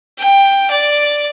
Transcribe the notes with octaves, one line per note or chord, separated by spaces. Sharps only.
G5
D5